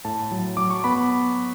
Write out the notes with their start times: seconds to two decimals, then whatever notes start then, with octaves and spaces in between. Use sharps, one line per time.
0.05 A2 A5
0.31 F#3
0.57 F#3 D6
0.70 C#6
0.84 B3 B5